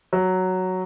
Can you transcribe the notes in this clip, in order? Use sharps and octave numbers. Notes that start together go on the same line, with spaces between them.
F#3